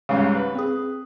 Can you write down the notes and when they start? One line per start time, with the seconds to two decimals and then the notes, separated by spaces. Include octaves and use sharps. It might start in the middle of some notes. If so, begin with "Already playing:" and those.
0.09 C2 G#2 C#3
0.35 B4
0.55 C4 G#4